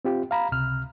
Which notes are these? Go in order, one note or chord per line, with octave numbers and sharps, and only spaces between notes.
C4 F4 G4
F5 A#5 B5
C#2 C3 F6